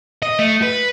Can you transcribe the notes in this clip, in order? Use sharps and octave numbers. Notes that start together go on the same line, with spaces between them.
D#5
A3
B4